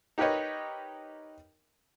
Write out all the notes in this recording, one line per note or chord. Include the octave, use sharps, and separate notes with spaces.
D#4 G4 A#4 B4 C#5 D#5